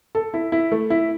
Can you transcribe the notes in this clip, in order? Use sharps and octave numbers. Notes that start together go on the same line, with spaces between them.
A4
E4
E4
A3
E4